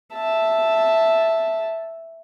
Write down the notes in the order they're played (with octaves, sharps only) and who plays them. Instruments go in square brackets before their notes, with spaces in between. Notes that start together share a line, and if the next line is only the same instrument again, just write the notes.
[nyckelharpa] E5 A5